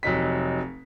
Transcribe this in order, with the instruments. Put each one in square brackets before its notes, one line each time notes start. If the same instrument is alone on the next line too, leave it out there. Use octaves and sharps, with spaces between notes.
[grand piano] F1 F#3 D#4 B6